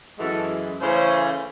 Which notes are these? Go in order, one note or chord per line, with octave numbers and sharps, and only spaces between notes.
F#2 E3 G#3 F#4 A4
C#3 E3 A3 C#4 G#4 C5